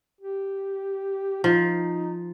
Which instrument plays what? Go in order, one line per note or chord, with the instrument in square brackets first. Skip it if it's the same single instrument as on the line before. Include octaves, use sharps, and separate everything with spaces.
[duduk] G4
[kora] F3 [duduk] D#4